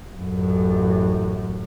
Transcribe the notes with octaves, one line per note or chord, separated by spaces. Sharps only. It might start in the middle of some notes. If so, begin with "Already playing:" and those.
A1 F#2